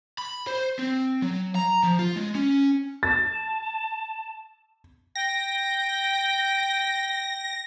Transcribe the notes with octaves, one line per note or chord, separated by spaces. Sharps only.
B5
C5
C4
F#3
A#5
F3
F4
G#3
C#4
A5 A6
G5 A#6